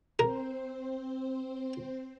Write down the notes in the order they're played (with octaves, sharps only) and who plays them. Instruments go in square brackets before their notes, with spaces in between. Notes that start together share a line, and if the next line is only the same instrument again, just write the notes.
[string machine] C4 C5 [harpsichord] A#4